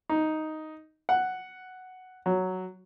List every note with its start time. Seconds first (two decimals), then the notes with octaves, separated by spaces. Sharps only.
0.09 D#4
1.09 F#5
2.26 F#3